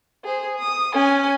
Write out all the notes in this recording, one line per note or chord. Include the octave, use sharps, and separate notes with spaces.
G#4 C5
D#6
C#4 G#5